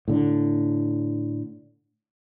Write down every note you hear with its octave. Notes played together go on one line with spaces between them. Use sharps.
A2 D3